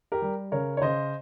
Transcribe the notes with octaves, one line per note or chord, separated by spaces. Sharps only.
G4 A#4
G3
C#3 A#4 C#5
C#5
C#3 C5 D#5